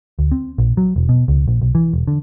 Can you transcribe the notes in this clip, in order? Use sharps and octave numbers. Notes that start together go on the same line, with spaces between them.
D2
C4
A#1
F#3
E1
B2
C#2
A#1
B1
E3
E1
D3